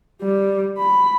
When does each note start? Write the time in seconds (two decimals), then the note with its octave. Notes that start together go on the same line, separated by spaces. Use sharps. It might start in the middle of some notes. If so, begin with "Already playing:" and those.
0.21 G3
0.78 B5